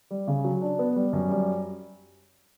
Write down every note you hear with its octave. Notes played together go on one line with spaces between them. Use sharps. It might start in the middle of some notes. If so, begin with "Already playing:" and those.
G3
C#3
F#3
D4
B3
G3
F#2
G3